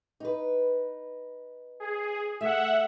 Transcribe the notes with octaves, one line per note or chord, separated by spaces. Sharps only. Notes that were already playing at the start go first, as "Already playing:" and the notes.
D#4 B4
G#4
A3 E5 F#5